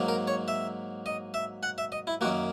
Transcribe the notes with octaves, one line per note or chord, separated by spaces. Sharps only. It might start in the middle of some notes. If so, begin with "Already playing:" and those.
Already playing: G#2 F#3 A#3
A#4
C#5
E5
D#5
E5
F#5
E5
D#5
E4
F#2 D#3 A#3 F#4